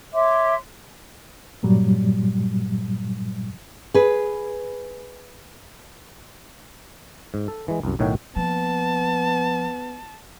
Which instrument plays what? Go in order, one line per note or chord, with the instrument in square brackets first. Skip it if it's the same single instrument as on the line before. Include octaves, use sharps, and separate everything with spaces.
[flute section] C#5 E5 C6 D6
[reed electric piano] G2 A#2 F#3 G3
[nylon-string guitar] G#4 B4
[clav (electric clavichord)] G#2
A4
E3 G#3
C2 F#2
B1 A2 D#3 C#5 F#5 G5
[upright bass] F3 A#3 [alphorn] B3 [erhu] A5